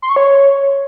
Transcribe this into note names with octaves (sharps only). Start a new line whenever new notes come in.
C6
C#6
C#5